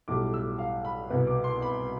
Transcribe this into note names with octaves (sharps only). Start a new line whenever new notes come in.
B1 A2 G3 D6
E6
F5
B5
C2 B2 B3
D6
C6
B5